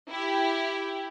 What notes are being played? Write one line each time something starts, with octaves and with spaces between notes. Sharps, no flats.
E4 G4